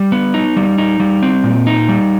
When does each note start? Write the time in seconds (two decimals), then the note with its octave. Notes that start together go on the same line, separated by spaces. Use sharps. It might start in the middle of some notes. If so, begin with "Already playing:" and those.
Already playing: G3
0.12 B3
0.34 D#4
0.57 G3
0.78 D#4
1.00 G3
1.23 C4
1.44 A#2
1.67 D#4
1.89 G3